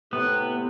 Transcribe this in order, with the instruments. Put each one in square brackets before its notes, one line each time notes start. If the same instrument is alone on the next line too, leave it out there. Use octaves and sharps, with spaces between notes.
[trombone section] A2 C3 [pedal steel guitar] B3